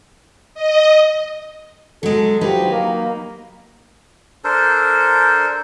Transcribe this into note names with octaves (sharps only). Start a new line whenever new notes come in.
D#5
F#3 G#3 A4
D3 F3 F#3 D#4 G4 B4
A#3
D4 A4 A#4 C5